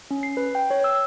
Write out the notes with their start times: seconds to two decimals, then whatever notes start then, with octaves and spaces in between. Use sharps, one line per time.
0.11 C#4
0.23 C7
0.37 B4
0.55 G5
0.70 C#5
0.84 E6